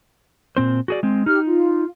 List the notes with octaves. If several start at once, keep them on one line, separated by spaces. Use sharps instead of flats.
A#2 C4 C5
F#4 G#4 D5
G#3 C4
D#4 G4 F6
F4